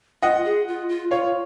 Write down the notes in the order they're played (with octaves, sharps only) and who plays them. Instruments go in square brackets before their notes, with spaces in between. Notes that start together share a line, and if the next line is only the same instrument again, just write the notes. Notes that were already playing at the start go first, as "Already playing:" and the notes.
[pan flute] F4 [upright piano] D#5 F#5
[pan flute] G#4
F4
F4
[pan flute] F4 [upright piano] C#5 F5